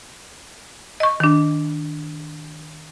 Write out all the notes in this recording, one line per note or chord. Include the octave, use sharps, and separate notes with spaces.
D#5 C#6
D#3 D4